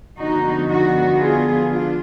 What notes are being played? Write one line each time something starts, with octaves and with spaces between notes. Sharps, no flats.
D3 F3 B3 D#4 F#4
D#4 F#4
F4 G#4
D4 F4